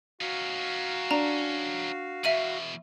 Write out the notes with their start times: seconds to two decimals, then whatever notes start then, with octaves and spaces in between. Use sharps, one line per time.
0.21 C#4 D#4 F#4 F5
1.11 D4 A#5
2.24 E2 B2 E5 D#7 F#7